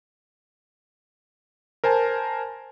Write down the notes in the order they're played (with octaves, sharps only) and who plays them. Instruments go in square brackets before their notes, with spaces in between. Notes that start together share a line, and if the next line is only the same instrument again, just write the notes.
[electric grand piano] A#4 C5 G#5 A5